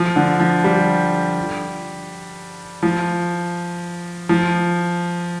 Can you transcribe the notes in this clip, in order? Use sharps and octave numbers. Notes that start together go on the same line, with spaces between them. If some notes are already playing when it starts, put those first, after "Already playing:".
Already playing: F3
D3
F3
G3
F3
F3